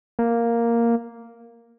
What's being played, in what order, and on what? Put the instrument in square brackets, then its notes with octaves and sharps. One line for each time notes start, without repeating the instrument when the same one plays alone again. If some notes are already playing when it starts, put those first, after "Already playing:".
[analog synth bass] A#3